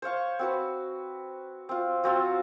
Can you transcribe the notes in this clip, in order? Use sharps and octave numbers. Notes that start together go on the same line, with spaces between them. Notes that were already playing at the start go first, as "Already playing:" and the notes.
C5 C#5 F5 C#6
C4 F#4 B4
C4 F4
F#3 C4 F4 F#4